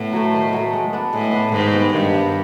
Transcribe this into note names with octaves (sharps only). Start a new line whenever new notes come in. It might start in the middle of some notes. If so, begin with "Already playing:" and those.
Already playing: A2 B3
F#3 A3
D#3
F#3 A3
G#3
B3 D4
A2 G#3
B3 D4
G#2 D#3
G3 B3
G2 D#3
G3 B3